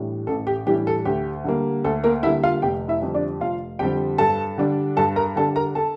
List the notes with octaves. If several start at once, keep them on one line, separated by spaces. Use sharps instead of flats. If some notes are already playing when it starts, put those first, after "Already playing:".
Already playing: A2 E3 G3 D4
A1 A4
G4
A2 E3 G3 D4 G4
A4
D2 G4
D3 G3 A#3
D2 A4
A#3 A#4
D3 G3 A#3 E4 E5
F4 F5
F1 G4 G5
E4 E5
F2 D3 G3 C4
D4 D5
F1 F4 F5
F2 D3 G3 C4 G4 G5
G2 A4 A5
D3 G3 D4
G2 A4 A5
A#4 A#5
D3 G3 D4 A4 A5
A#4 A#5
A4 A5